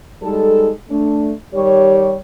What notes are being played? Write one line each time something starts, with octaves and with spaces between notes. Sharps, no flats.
G3 G#3 D#4 A4
A3 D4
D#3 G3 G4 C#5